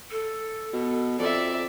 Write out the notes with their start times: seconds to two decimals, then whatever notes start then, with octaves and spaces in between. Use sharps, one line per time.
0.11 A4
0.73 B2
1.19 F2 A4 D5 E5